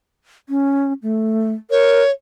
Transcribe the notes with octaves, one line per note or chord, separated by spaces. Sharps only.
C#4
A3
A#4 C#5